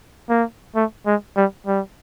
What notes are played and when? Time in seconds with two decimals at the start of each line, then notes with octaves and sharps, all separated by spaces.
0.30 A#3
0.75 A3
1.06 G#3
1.36 G3
1.67 G3